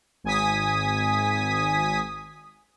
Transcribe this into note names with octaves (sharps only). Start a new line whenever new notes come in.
G#1 G#5 D#6 B6